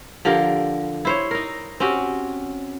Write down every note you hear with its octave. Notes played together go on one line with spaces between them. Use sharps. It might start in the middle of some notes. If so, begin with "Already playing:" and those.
D3 F3 G4 A#4
E4 C5 C#5
D#4 A#4
C4 C#4 F#4 G4